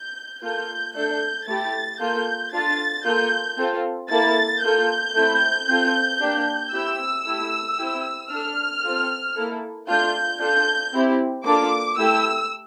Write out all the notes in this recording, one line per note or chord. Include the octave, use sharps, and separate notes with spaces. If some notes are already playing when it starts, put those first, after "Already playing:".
Already playing: G6
A#3 F4 A4 G6
A3 D4 A4 G6
A3 E4 G4 A6
A#3 F4 A4 G6
D4 F4 A4 A6
A#3 F4 A4 G6
C4 F4 A4
A#3 E4 A4 A6
A#3 F4 A4 G6
A3 C4 E4
C4 F4 A4
A#3 D4 G4
C4 E4 G4 E6
A3 E4 G4
C4 E4 G4
D4 A4 F6
C4 F4 A4
A#3 E4 A4
A3 D4 F4 G6
D4 F4 A4 G6
C4 E4 G4
A#3 D4 F4 A4 D6
A3 E4 G4 E6